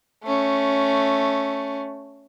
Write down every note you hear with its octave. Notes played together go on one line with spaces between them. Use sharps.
A3 C#4